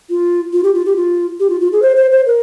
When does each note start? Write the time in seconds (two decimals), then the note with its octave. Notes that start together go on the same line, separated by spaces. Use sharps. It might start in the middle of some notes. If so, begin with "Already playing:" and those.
0.10 F4
0.53 F4
0.63 G4
0.74 F4
0.85 G4
0.96 F4
1.40 G4
1.50 F4
1.60 F4
1.72 G#4
1.82 C5
1.96 C5
2.11 C5
2.26 A#4